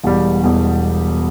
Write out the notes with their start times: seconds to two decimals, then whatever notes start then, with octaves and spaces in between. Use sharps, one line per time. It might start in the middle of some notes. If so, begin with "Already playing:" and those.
0.04 E1 E2 B2 G3
0.43 E1 E2 B2 G3